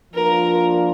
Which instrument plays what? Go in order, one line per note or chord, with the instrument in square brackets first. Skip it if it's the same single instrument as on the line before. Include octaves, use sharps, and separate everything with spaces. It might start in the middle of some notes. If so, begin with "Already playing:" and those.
[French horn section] F3 A#3 D4 F4 [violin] A#4